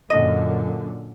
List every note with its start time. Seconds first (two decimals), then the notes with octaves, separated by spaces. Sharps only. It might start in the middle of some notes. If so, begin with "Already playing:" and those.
0.10 F#2 A#2 D3 D#5